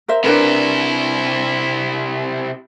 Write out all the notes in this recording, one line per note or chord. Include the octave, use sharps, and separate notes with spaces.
A#4 C5 E5
C3 D4 E4 A#4 B4